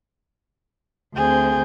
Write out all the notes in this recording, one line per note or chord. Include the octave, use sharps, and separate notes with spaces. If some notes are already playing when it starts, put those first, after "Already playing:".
D2 C4 G#4 G6